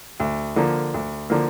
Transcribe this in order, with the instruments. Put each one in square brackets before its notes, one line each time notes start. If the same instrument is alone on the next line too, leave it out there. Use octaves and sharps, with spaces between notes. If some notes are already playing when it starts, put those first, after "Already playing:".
[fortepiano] D2
D3 F3 A#3
D2
D3 F3 A#3